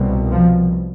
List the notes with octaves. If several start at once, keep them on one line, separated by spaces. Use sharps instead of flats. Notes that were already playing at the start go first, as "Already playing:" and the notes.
Already playing: C2 B2
F3